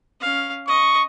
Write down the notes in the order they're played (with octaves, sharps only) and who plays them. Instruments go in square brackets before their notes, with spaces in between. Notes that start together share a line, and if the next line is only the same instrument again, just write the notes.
[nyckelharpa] C#4 F5
[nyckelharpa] D#5 [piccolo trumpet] C#6